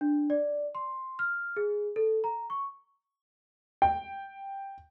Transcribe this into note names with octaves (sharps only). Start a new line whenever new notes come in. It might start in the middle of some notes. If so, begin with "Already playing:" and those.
D4
D5
C6
F6
G#4
A4
A#5
C#6
G5